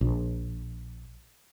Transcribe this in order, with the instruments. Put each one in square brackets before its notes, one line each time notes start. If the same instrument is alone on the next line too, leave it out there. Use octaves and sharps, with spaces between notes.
[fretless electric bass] A#1